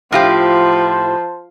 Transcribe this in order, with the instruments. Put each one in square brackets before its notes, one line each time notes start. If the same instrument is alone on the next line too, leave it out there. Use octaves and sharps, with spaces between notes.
[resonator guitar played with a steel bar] A2 F4 G4 [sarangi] F3 [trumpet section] C5 A5